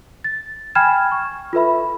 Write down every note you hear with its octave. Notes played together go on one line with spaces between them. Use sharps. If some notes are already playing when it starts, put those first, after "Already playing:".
A6
G5 G#5 B5 F6 G#6 E7
C#6
F4 A4 B4 E5 B5